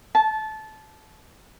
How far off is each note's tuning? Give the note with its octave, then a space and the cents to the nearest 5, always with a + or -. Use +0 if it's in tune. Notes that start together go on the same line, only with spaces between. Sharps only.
A5 -20